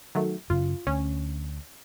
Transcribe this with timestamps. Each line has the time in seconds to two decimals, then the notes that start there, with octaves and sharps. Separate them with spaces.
0.15 D#3 F#3 A3
0.50 F#2 C#3 F#3 F4
0.87 D2 C#4